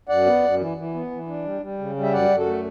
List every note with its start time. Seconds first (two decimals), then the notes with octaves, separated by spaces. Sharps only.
0.09 F#2 D5 F#5
0.26 B3
0.43 F#2
0.60 E3
0.77 E3
0.94 B3
1.11 E3
1.28 D4
1.45 G3
1.61 G3
1.79 C#3
1.96 G3
2.03 E5
2.13 F#2 D5 F#5
2.30 F#2
2.38 F#4 A4
2.46 A3